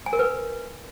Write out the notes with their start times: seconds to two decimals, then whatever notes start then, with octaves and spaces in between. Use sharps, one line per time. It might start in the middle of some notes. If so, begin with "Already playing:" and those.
0.06 G#5
0.13 A#4
0.19 B4